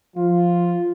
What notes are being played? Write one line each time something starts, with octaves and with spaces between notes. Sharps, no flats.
F3 F4